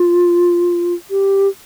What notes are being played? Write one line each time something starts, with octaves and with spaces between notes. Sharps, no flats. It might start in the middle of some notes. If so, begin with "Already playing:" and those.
Already playing: F4
G4